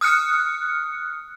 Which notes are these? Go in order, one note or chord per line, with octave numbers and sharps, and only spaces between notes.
D#6 F6 F#6 C#7